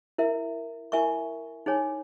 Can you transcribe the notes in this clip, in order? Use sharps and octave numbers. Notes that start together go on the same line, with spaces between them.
E4 A#4 E5
E4 A#4 E5 G#5 C#6
D#4 G#4 C#5 G#5